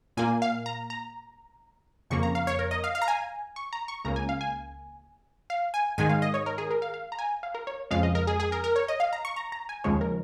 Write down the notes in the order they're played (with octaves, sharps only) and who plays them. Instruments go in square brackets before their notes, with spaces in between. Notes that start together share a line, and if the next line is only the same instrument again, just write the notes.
[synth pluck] A#2 A#3 G#5
F5
A#5
A#5
F2 C#3 A#3 C#6
A#5
F5
C#5
A#4
D#5
F5
F5
A#5
G#5
C#6
A#5
C#6
C#2 C#3 A#3 A#5
G#5
F5
G#5
F5
G#5
G#2 D#3 G#3 G#5
F5
D#5
C#5
A#4
G#4
A#4
F5
F5
A#5
G#5
F5
A#4
C#5
F2 C#3 G#3 F5
D#5
A#4
G#4
G#4
A#4
A#4
C#5
D#5
F5
A#5
C#6
A#5
A#5
G#5
D#2 C#3 F3 G#3 C#5
A#4